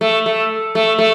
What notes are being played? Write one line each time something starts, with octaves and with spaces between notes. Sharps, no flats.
A3
A3
A3
A3